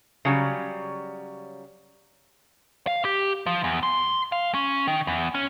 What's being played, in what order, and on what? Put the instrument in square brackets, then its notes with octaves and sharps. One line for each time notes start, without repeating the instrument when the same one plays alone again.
[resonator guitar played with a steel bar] C#3 F#3 G3
[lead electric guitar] F5
G4
F3
E2
C6
F5
C#4
D#3
E2
C#4